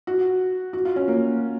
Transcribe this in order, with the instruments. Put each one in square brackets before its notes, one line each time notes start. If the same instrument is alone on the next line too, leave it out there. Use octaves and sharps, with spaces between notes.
[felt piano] F#4
F#4
F4
C#4
A#3